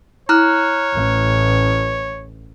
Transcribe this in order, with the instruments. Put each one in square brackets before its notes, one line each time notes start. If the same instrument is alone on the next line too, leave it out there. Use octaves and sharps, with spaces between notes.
[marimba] E4 [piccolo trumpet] C#5 [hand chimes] A#5 F6 F#6
[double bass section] A1